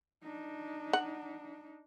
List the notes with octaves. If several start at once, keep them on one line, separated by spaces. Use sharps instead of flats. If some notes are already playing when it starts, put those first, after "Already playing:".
D4 D#4
F#5